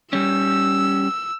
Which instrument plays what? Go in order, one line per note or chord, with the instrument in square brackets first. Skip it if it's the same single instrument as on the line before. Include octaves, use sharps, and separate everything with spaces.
[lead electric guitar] G3 C#4 [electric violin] E6